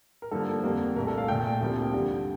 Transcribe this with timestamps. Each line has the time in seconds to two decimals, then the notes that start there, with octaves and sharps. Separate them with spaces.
0.22 A#4
0.31 G2 D3 F3 A#3 A4
0.64 F2 D3 G3 A#3
0.96 C2 A#2 A3 A#4
1.07 A4
1.18 F5
1.28 A#1 A#2 A3 G5
1.61 D2 C3 F3 A#3
1.93 G2 D3 G3